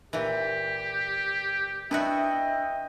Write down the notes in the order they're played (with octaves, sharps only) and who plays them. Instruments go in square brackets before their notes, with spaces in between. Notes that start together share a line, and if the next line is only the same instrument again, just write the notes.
[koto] A#2 E3 [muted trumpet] G4
[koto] B3 E4 F#4 [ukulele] D4 [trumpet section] D#5 E5 G5